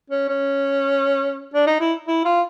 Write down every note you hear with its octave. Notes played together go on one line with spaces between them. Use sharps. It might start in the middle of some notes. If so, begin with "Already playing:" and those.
C#4
C#4
D4
D#4
E4
E4
F4